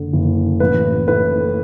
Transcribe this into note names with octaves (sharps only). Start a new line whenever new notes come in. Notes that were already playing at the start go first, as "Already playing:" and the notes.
Already playing: F#1 D3
F#1
A1 B4
A2 B4